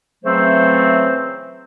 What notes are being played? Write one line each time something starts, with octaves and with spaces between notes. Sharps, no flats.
C#3 E3 F#3 A3 C4 C5